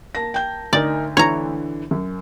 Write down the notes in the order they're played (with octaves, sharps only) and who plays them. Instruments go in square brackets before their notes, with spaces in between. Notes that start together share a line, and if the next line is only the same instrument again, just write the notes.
[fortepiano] A#3 A5 [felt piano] A#6
[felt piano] G5 G6
[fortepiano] D2 [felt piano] D#4 A#4 [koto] D5
[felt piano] D3 E3 [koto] C#5 A#5
[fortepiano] F#2